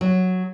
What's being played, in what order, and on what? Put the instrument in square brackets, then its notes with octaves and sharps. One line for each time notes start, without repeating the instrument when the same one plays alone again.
[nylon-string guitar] F#3